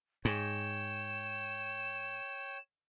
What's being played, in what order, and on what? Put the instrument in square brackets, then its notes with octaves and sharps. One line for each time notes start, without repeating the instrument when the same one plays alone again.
[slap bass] G#2 [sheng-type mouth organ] C#5 G5 [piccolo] E7